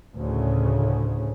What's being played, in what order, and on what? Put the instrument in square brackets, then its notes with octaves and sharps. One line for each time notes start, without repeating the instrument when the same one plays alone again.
[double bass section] D2 A2 C#3